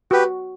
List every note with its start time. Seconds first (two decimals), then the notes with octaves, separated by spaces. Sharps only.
0.11 F#4 G4 B4